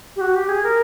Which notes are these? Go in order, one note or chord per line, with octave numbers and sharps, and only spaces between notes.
G4
F#4
G4
G#4
A#4